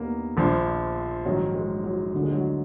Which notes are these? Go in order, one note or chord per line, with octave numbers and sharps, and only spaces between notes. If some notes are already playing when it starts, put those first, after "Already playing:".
Already playing: D#2 D#3 A#3 B3
A#1 A#2 F3
A#1 G#2 D#3 F#3
G#3
F#3
D2 D3 F#3
G#3
F#3